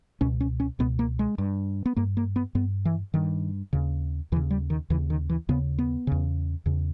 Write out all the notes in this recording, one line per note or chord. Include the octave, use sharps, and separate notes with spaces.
C#2 B2 C#4
C#4
C#4
C#2 B2 B3
A#3
G#3
G2
B3
G2 A#3
A#3
B3
G2 B3
E3
G2 D#3
D#2 C#3
D#2 C#3 E3
G3
D#3
D#2 C#3 E3
D#3
E3
D#2 C#3 B3
B3
E2 C#3
E2 C#3